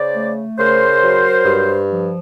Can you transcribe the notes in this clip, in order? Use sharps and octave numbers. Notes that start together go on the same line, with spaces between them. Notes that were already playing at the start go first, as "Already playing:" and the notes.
Already playing: C#3 C5 D5
A3
C#3 A#4 C5
F#3
G2
F3